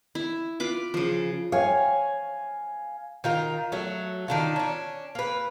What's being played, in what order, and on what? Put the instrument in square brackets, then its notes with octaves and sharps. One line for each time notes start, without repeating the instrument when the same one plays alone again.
[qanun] E4
F4 B4 D6
C#3 F3
[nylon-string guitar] C#5 [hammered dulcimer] F5 G#5
[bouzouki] D#3 F4 A#4
F#3 A3
D#3 D4 F4
C#4 D4
A#3 B4